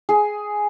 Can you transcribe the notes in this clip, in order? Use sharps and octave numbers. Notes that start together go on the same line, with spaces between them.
G#4